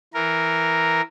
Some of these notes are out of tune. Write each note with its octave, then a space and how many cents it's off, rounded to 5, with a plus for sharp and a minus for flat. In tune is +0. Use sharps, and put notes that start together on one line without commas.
E3 +0 A#4 +0